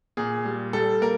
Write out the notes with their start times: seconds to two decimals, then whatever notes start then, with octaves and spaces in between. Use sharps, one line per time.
0.17 A#2 G#4
0.45 G3
0.73 G3 A4
1.02 A#3 A#4